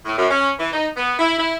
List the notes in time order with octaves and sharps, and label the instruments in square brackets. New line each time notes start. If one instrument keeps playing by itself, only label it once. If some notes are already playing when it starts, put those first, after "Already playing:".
[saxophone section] A2
F#2
C#4
E3
D#4
B3
E4
E4